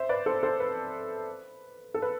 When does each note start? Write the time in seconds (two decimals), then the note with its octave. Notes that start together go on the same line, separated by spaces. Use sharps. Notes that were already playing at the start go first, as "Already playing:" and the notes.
Already playing: C5 E5
0.09 B4 D5
0.26 A4 C5
0.43 A4 C5
0.60 B4
1.94 A4
2.02 B4